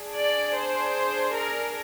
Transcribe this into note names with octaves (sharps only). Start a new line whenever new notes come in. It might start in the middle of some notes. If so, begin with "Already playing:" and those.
Already playing: D4 G#4
D5
C5
A#4